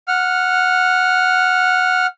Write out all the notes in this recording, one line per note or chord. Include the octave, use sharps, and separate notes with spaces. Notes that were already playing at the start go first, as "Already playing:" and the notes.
F#5 F6